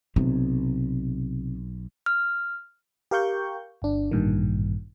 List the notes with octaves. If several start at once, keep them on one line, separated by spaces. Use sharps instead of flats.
B1 C3
F6
G4 A#4 F5 G5 C#6 G6
G1 D4
A1 G2 A#2 D#3